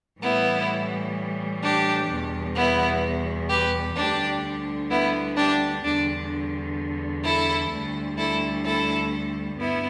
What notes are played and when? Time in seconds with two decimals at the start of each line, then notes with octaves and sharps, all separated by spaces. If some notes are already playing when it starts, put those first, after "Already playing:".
0.20 A2 E3 G3 B3 E4
1.61 D4 G4
2.08 E2 B2 G3
2.55 B3 E4
3.49 G4 B4
3.95 D2 D3 G3 D4 G4
4.89 B3 E4
5.36 D4 G4
5.83 E2 D3 G3 D4
7.23 E4 A4
7.70 D2 D3 G3
8.17 E4 A4
8.64 E4 A4
9.58 G2 B3 E4